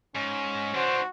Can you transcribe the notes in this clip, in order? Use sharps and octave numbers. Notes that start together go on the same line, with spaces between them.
G#2 C#4
E3 D4 F#4 C5